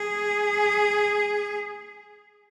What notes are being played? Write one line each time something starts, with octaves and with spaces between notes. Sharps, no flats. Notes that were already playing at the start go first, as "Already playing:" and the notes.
Already playing: G#4